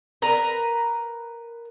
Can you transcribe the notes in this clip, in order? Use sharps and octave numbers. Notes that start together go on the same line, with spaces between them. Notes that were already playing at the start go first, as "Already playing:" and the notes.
A#4 B4 A#5